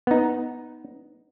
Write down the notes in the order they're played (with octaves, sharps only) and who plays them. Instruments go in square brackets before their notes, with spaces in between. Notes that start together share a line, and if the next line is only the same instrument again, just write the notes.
[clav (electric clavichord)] B3 D#4